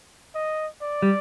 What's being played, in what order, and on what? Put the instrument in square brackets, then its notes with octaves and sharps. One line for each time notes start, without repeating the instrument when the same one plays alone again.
[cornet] D#5
D5
[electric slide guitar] G3